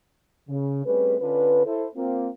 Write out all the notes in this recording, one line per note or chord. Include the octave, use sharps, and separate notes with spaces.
C#3
G3 A3 C4 C#4 G#4 B4
D3 C#4 D4 F4 B4
E4 A4 C5
A#3 C4 F4